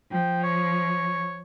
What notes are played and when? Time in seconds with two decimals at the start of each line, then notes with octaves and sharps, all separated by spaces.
0.12 F3 G5
0.44 C#5